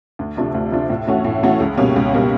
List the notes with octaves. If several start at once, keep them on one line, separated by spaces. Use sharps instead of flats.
D2
C3 F3 A3 D4
D2
C3 F3 A3 D4
A2
E3 A3 C#4 F#4
A2
E3 A3 C#4 F#4
C#2
B2 G3 A#3 C#4
C#2
B2 G3 A#3 C#4